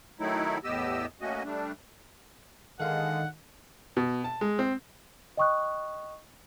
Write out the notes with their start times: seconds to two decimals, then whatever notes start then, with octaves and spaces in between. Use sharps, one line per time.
0.20 D#3 F#3 A3 D#4 E4
0.64 E2 A2 B3 G4 D#5 E6
1.21 A3 A#3 C#4 F#4 D#5
1.44 G3 A3 D4
2.80 D3 D#3 G#3 A4 F5 F#5
3.97 B2
4.24 A5
4.41 G#3
4.59 C4
5.37 D#5 G5 C#6 D#6 F#6